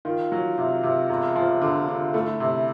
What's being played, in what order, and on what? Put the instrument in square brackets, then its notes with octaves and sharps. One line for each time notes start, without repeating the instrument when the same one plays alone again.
[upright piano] D#3 [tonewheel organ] F4
[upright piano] F#3
C3
C3
E1
F3
D3
D3
[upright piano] A3 [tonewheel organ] E4
[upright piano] C3